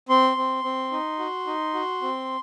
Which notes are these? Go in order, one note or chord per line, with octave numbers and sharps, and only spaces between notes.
C4 C6
C4
C4
D#4
F#4
D#4
F#4
C4